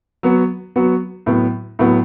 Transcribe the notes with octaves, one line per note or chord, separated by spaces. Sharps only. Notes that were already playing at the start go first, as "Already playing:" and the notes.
F#3 B3 F#4
F#3 B3 F#4
A2 F#3 B3
A2 F#3 B3